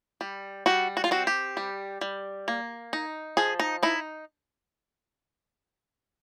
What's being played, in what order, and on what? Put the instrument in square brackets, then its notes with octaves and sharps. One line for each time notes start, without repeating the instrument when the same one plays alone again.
[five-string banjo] G3
G3 F#4
F#4
F4
C4 F#4
G4
G3
G3
A#3
D#4
F3 G#4
D#4
D#4 E4